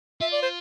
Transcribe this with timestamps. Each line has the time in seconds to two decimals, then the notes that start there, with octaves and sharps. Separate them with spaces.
0.21 F4 E5
0.33 D5
0.43 C5